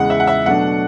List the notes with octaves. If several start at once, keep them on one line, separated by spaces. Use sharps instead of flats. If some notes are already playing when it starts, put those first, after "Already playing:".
Already playing: E2 C#3 G#3 F#5
E5
F#5
E5
B2 F#3 A3 D4 F#5